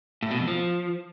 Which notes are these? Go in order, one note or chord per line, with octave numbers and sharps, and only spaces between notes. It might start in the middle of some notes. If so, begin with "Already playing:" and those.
A2
B2
F2
F3